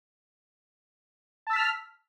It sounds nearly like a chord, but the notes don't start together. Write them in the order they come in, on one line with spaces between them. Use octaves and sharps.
A5 E6 B6 F6